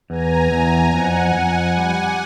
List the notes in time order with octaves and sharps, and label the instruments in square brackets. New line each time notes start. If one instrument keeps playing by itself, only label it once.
[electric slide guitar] E2 [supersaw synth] G#5 A#5
[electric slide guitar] E2
[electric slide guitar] F2 [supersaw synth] F#5 G#5
[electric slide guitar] F2
[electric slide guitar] G3 [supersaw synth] F#5 G#5